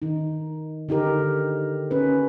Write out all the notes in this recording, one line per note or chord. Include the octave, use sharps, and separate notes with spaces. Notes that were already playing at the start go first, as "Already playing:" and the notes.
D#3 D#4
D3 D#4 G4 A#4
C#4 B4